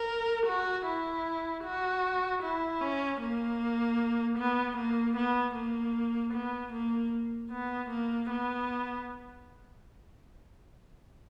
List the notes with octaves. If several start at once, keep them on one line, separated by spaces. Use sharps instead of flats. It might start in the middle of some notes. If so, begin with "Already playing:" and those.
Already playing: A#4
F#4
E4
F#4
E4
C#4
A#3
B3
A#3
B3
A#3
B3
A#3
B3
A#3
B3